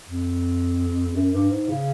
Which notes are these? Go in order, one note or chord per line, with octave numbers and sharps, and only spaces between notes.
F2
F#2
G2
G#2
C#3